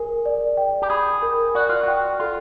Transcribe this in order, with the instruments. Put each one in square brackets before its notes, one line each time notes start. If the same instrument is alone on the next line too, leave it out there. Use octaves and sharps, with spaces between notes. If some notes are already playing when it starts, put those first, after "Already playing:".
Already playing: [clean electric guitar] G#4 [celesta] A#4
[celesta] D5
G5
[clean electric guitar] G4
[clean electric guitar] G#4 [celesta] B5
[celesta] A#4
[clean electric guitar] F#4 [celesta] D5
[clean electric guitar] F4
[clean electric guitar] F#4 [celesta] G5
[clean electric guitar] F4 [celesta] A4